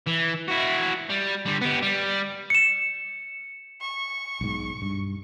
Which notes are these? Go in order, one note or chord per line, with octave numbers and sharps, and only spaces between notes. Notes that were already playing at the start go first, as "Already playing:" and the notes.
E3
E4 F#4
G3
D3 G3
B3 G4
G3
C#7 E7
C#6
B1 G#2
G2